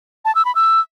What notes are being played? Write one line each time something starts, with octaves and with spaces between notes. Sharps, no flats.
A5
E6
B5
E6